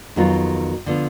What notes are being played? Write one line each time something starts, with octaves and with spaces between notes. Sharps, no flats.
F2 D#3 F#3 B3 F4
D3 F3 B3